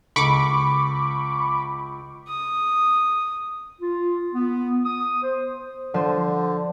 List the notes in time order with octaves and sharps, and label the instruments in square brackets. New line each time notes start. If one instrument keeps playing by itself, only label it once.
[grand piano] C#2 [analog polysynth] B5 C#6 D6
[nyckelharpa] D#6
[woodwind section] F4
B3
D#6
C5
[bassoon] D3 [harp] F3 C5